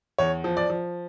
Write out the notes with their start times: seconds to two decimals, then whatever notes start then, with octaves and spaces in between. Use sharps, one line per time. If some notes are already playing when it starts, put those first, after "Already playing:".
0.18 E2 C#5
0.44 F3
0.57 D5
0.70 F3